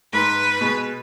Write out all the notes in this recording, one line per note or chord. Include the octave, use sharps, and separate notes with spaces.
G#2 B4
B2 G#3